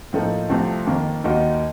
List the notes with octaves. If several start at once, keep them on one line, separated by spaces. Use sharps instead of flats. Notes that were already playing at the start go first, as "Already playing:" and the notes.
A2 F3 A#3 D#4 A4
C2 C3 F3 A3 C4
F2 D#3 A#3
D#2 D#3 A#3 D#4 F#4